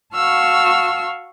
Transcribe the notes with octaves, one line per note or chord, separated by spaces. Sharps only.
F#4 F5 A5 C#6 E6 F6